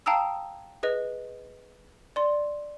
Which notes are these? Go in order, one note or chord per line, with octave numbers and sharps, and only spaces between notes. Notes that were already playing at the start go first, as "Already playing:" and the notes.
F5 G5 A5 A#5 D#6 E6
G#4 B4 D#5
D5 C6